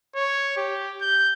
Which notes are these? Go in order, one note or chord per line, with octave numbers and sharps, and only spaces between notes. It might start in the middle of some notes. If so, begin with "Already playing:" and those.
C#5
G4
G6